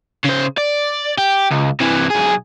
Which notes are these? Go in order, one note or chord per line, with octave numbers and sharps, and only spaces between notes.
C#3 C5
D5
G4
C#2
C3 E3
B1 G#4